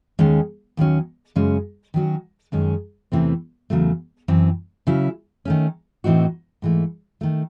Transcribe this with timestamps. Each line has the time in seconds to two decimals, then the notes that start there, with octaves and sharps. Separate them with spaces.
0.19 D#2 D#3 G#3 C#4
0.77 D#2 D#3 F#3 C#4
1.36 F#2 C#3 G#3 C#4
1.94 D#3 F#3 C#4 F#4
2.52 F#2 D#3 G#3 C#4
3.12 E2 C3 E3 A3 C4
3.70 E2 C#3 F#3 A3
4.28 F#2 E3 C4
4.87 C#3 F#3 C#4 E4
5.45 D#3 A3 C#4
6.04 A2 E3 C4 D#4 F#4
6.62 G#2 E3 A3
7.21 D#3 A3